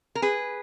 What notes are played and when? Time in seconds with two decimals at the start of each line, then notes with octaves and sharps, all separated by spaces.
0.15 A#4
0.22 G#4 B4